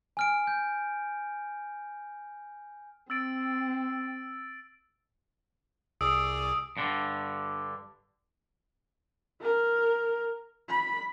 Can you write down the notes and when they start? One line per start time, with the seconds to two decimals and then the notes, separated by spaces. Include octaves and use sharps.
0.17 G#5 F6 D7
0.47 G6
3.10 C4 E6 A6 D7
6.01 C2 G#4 D5 D#6 E6 D7
6.77 G2 D3
9.41 A#4
10.68 B5